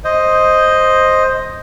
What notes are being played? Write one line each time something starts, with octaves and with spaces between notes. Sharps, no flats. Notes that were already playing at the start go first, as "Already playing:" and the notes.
C5 D#5